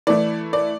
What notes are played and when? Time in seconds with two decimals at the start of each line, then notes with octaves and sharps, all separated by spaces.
0.07 E3 A3 E4 D5
0.53 D5